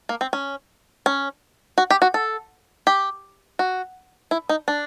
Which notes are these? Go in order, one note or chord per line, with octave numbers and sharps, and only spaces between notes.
A#3
C4
C#4
C#4
F#4
G4
F#4
A4
G4
F#4
E4
D#4
D4